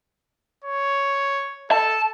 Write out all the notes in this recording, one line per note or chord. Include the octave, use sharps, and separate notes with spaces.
C#5
A4 A5